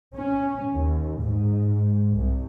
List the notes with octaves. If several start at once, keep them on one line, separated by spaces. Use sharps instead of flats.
C#4
D#2
G#2
C2